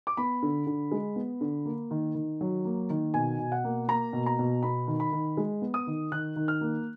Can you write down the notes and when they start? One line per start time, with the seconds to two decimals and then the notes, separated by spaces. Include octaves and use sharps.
0.07 D6
0.17 B3 B5
0.43 D3
0.67 D3
0.91 G#3
1.16 B3
1.41 D3
1.65 A#3
1.91 D#3
2.15 D#3
2.41 F#3
2.65 A#3
2.90 D#3
3.14 B2 G#5
3.39 B2
3.52 F#5
3.64 A#3
3.88 A#3 A#5
4.13 B2
4.26 A#5
4.39 B2
4.63 B3 B5
4.87 D#3
5.00 B5
5.12 D#3
5.37 G#3
5.62 B3
5.74 D#6
5.87 D#3
6.12 D#3 F#6
6.36 D#3
6.48 F6
6.61 A#3